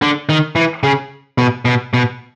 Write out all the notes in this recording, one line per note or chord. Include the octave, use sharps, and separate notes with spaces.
D3
D#3
E3
C#3
B2
B2
B2